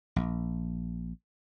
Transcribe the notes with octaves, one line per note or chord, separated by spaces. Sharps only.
A#1